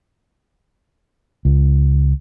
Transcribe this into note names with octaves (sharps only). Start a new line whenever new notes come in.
C#2